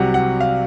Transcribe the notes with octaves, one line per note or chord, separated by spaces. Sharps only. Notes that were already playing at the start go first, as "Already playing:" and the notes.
Already playing: C2 C3 F#3 F#5
F#5
F5